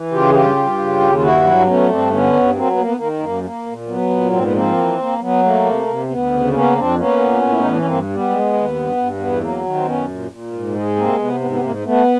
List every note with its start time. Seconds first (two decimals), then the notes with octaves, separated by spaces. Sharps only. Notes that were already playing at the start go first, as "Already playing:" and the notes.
Already playing: E3
0.12 C#3 F4 G4
0.29 G#4
0.34 G2 F4 G4
0.56 G2
0.78 C#3
1.00 D#2
1.15 F4
1.22 G2 E4 F#4
1.44 F#3
1.60 D4
1.67 A3 B3 C#4
1.89 G2 C4 D4
2.11 D3 B3 C#4
2.33 G2
2.55 F#3 A#3 C4
2.70 B3
2.77 A#3
2.85 B3
2.97 D#3 A#3
3.19 F#2 A#3
3.44 A#3
3.66 A#2
3.88 F#3 B3
4.10 A#2
4.33 G#2 C4
4.43 B3
4.54 F3 A#3 C4
4.77 E3
4.99 A#3
5.20 F#3 B3
5.43 A3 A#3
5.65 C3
5.87 C3
6.09 D2 B3
6.31 C#3
6.53 A#3 B3 C#4
6.75 F2 C4 D4
6.97 A#3 B3 C#4
7.20 A#2
7.42 A2
7.49 E4
7.59 D#4
7.64 E3 D4
7.77 C#4
7.86 G2 A#3 C4
8.09 G3
8.15 B3
8.30 G#3
8.53 D#2
8.74 G2
8.97 G2
9.19 E2 B3
9.41 F#3 A#3
9.63 D#3
9.75 C4
9.85 F#2 B3 C#4
10.08 A#2
10.30 A#2
10.52 G#2
10.74 G#3
10.96 C3 A#3 C4
11.18 C3 B3
11.40 G#2 B3
11.51 B3
11.62 G#2 A#3
11.84 A3 B3